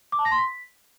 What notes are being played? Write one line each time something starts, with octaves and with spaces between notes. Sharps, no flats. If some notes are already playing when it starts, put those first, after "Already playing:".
D6
A5
A#6
C6
B6